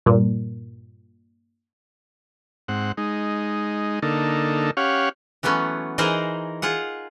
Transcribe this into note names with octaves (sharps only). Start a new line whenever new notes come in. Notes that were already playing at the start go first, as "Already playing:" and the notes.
G2 A#2
G#2 C4 F#5
G#3 D#4
D3 A#3 D#4 A4
C#4 G4 C#5 F5 F#5
E3 F#3 A3 B3 C#4
E3 D#4 G#4 A#4 C5 D#5
F4 G#4 F#5